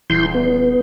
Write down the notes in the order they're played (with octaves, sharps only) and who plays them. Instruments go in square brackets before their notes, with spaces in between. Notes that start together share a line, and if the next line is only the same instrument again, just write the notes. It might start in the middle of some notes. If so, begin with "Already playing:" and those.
[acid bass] D#1 [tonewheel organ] E3 C6 G6
[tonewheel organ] B3